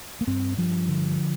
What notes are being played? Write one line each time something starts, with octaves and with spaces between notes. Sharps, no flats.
A#3
G2 C4
G2 F3
D3